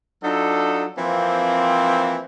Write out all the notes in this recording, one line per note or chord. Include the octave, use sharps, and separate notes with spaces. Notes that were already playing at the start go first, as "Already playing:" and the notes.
F#3 D4 D#4 F4 A4
E3 F3 A#3 C4